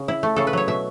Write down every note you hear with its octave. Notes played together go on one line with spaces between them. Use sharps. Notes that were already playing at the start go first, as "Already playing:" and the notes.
Already playing: C#3
E4
A3
C#3 A4
B4
F#3 C#5
B2 E5